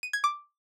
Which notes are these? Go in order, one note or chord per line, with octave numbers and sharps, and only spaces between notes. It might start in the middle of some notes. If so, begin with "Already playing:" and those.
D#7
G#6
D6